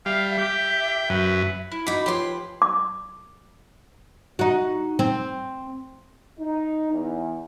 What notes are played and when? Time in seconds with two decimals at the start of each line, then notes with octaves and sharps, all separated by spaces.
0.06 G3 E5 F5
0.38 G4 G5
1.10 F#2 B4
1.72 E4
1.87 D#4 F#4 B5 D6
2.06 F3 G4 B4 C#5 C6
2.62 D6
4.39 D#4 F#4
4.99 C4
6.40 D#4
6.92 E2